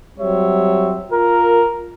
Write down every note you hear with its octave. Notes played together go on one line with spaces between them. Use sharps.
F#3 G3 C4 C#5 E5
F4 A#4